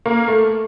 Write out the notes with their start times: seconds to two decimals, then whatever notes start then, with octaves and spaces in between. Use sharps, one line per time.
0.06 A#3
0.28 A3